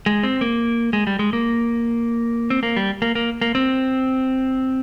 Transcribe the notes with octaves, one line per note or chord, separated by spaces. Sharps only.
G#3
C4
A#3
G#3
G3
G#3
A#3
C4
A#3
G3
A#3
A#3
A#3
C4